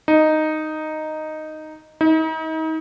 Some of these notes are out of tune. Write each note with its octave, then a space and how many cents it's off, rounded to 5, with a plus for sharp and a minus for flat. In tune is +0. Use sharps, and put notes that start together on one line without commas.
D#4 -5
D#4 +35